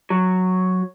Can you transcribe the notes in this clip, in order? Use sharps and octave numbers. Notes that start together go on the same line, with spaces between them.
F#3